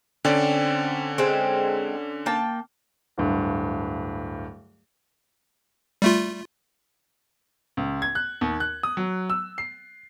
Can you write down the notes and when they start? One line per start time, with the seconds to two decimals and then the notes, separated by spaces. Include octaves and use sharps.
0.25 D3 C4 C#4 D5
1.18 G#3 C4
2.26 A#3 G5 A5
3.18 D1 G2
6.02 G3 A3 F4
7.77 C#2
8.02 G#6
8.15 F#6
8.41 D#2
8.60 F#6
8.83 D#6
8.97 F#3
9.30 E6
9.58 C7